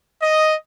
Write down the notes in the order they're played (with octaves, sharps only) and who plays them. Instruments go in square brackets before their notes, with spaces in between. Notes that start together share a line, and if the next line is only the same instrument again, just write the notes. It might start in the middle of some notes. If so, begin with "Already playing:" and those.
[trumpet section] D#5